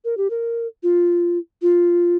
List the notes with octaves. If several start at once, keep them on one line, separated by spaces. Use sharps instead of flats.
A#4
G4
A#4
F4
F4